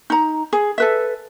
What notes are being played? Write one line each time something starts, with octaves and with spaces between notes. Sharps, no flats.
D#4 A#5
G#4
A4 B4 E5